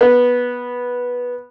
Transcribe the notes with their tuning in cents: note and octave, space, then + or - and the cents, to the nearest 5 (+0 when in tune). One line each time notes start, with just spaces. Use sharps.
B3 -10